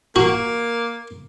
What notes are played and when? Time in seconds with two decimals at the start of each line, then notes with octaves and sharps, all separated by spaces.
0.16 A#3 F#4